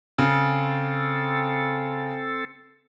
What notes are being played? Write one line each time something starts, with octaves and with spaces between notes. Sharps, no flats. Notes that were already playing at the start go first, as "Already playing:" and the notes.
C#3 C4 A4